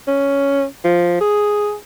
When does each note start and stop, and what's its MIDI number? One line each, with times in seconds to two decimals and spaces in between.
0.08 0.65 61
0.85 1.19 53
1.21 1.75 68